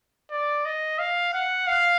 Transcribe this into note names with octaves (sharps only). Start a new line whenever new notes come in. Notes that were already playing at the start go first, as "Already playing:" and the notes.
D5
D#5
F5
F#5
F5